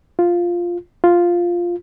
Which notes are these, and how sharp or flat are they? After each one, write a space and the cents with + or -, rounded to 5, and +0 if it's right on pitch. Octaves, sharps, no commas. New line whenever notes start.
F4 +0
F4 +0